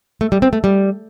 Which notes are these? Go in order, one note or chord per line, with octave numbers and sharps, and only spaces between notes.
A3
G3
C4
A3
G3